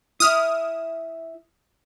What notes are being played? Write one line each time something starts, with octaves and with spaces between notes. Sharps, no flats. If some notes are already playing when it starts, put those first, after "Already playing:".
E4 E5 D#6 F6